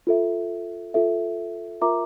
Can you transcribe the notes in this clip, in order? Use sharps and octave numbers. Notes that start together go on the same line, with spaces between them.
F4 A4 E5
F4 A4 E5
F4 A#4 E5 A#5 D6